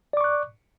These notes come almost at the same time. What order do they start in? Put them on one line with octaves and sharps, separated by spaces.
D5 D6 C#6 F#6